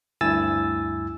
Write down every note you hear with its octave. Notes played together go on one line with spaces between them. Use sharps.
D2 G2 E4 G#5 E6 A6